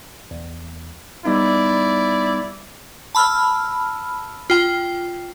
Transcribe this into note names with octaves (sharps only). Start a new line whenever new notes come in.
E2
G3 B3 D#4 E4 D5
A5 B5 E6 F6
F4 G5